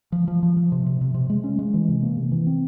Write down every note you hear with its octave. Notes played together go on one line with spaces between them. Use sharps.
F3
F3
F3
F3
C3
C3
C3
C3
G#3
C#4
G#3
E3
C3
A#3
C3
E3
C4